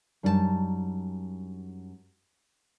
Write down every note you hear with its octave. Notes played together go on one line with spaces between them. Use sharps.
F#2 G3 D4 D#4 A#4 A5